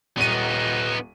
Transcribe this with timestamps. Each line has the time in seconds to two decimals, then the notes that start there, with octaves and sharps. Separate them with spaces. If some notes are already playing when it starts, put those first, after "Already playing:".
0.17 D#1 B3 D#4 D#7